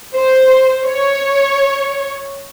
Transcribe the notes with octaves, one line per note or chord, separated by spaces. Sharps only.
C5
C#5